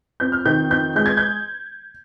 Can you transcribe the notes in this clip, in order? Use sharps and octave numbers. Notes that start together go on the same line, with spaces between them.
F2 G6
F6
D#3 G6
F2 G6
G#3 G6
G#6
G6